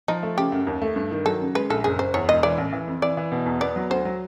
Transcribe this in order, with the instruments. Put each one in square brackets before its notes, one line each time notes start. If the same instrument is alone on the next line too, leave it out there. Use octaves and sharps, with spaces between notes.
[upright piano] F3 [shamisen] D#4
[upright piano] A3
[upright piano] C#3 [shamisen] G4
[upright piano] F#2
D#2
A3
G2
D#3
[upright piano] F#3 [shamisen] A4
[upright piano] C#3
[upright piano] G#3 [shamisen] B4
[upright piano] A#1 [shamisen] A4
[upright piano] F#1 [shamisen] G#4
[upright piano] F#1 [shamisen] C5
[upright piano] E2 [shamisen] C#5
[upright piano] E1 [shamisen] D#5
[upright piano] E3 [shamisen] D5
[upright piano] A1
E3
F2
[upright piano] E3 [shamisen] D5
[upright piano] E3
B2
E2
[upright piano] B3 [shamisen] D5
[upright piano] F#3
[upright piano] D2 [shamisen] C5
[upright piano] F#3